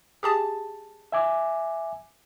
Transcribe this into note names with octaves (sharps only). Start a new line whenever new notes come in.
G4 G#4 A5
E5 G#5 D6